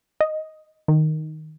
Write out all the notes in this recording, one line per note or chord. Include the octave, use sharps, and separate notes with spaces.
D#5
D#3